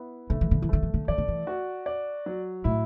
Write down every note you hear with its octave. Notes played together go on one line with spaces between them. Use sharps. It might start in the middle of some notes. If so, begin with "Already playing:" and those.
Already playing: B3 E4
D3 A3
E3
D3
E3
D3 A3
E3
D3
E3 D5
D3
E3
F#4
D5
F#3
A2 E4